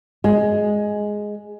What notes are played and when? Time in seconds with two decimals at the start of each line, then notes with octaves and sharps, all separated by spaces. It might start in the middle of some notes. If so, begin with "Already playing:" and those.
0.24 G#3